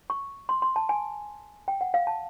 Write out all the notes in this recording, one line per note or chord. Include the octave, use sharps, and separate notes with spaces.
C#6
C6
C6
A5
G#5
G5
F#5
F5
A5